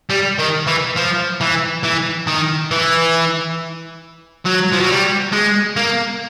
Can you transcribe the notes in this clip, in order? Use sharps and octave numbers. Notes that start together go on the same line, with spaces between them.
G3
D#3
E3
F3
E3
E3
D#3
E3
F#3
F3
F#3
G3
G#3
A#3